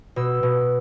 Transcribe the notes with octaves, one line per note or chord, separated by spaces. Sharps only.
B2 E6
B2